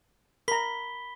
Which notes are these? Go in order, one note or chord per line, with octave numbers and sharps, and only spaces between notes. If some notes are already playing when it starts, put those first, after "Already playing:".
A#4 A#5 B5 B6 G7